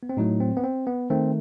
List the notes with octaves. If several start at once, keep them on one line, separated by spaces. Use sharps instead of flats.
B3
C4
A2 F#3 A3 D#4
C4
B3
C4
B3
D#3 A3 C4